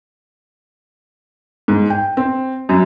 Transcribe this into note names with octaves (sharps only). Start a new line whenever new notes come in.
G#2
G5
C4
F#2